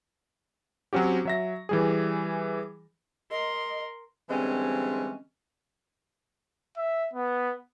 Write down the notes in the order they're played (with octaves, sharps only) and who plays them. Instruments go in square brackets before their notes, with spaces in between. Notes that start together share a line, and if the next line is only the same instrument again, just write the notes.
[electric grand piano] F#3 C4 C#4 F#4 G4
F#3 E5 A#6
E3 G3 G#4
[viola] A#4 C6 [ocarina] D#5
[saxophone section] D3 E3 G3 G#3 C4 C#4
[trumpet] E5
B3